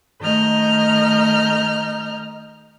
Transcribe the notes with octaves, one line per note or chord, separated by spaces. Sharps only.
D#3 A3 D#5 A#5 F6 G6